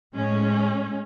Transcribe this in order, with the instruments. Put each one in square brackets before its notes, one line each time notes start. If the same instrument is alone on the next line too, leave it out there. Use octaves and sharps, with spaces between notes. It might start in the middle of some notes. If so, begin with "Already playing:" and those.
[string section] A2 G#3 C#4